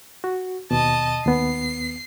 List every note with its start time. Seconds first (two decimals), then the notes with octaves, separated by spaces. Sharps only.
0.24 F#4
0.71 D#2 B2 D#5 A5
1.26 D#2 B3 C7